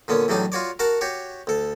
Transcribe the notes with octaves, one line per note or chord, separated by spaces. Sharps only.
A#2 D3 B3 C#4
E2 A2 F#3 G3 D4 D#4
F4 F#4 C#5 D5
F#4 A#4 F#5 A5
F#4 G4 C#5
D2 A4